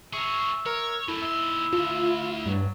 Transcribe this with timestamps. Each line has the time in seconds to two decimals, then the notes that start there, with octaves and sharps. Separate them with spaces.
0.13 G#4 A#4 E5 C#6
0.66 A#4 C#5
1.08 F#2 A3 E4 A4
1.22 D#2 E5 C6
1.73 A3 D4 F4
2.46 G2 F#3